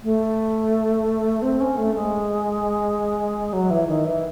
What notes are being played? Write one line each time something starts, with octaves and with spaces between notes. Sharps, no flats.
A3
C4
C#4
A3
G#3
F#3
E3
D#3
E3